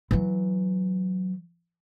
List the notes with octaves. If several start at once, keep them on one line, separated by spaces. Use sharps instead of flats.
E3 F#3